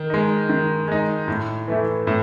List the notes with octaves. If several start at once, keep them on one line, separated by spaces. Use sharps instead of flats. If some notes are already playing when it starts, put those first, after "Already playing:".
Already playing: D#3
G#3 D#4
D#3
G#3 D#4
A2
E3 A3 E4
A2